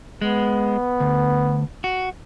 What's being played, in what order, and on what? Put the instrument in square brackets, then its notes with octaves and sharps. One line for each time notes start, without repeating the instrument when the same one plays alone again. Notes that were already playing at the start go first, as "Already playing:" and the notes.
[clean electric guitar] G#3 [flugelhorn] B3
[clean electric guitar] D2
F#4